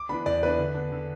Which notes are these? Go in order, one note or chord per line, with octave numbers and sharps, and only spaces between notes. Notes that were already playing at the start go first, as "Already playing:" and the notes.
Already playing: D6
E3 B3 D4 B5
E2 D5
E3 B3 D4 B4
D3
B3 D4
D3